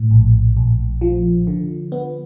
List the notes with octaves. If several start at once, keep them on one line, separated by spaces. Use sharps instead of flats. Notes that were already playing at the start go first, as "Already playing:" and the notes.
Already playing: A2
A#1
A#1
F3
D3
B3